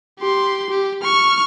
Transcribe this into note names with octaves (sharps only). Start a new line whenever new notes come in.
G4 C6
G4
C#6 F6